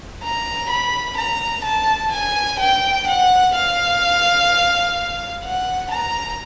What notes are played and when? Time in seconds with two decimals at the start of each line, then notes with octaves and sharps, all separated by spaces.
0.23 A#5
0.70 B5
1.18 A#5
1.65 A5
2.12 G#5
2.60 G5
3.08 F#5
3.54 F5
5.44 F#5
5.92 A#5